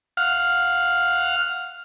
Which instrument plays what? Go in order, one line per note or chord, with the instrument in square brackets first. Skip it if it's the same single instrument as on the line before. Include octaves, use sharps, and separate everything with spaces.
[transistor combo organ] F5 F#5 F6